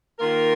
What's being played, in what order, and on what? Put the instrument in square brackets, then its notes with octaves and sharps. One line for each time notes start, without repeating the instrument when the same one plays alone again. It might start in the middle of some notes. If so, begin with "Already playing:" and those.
[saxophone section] D#3 A#3 F4 A#4